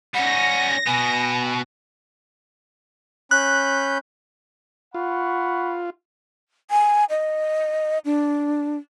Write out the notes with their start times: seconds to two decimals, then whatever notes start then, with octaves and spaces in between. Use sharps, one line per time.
0.14 G3 C#4 F#5 A#6
0.86 B2 B3 G#5
3.31 C#4 B5 F#6 G6
4.94 F4 F#5 B5 C#6
6.71 G#5
7.10 D#5
8.05 D4